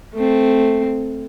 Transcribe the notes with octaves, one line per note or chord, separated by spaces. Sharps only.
A3 C4